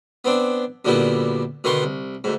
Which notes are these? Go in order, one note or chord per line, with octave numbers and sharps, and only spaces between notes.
B3 C4 D4
F#2 A#2 D3 G3 B3 E4
B2 D3 D#3 B3 C6 C#6
C2
D2 G#2